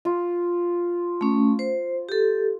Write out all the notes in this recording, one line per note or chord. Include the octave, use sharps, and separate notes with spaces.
F4
A3 C#4
C5
G4 A4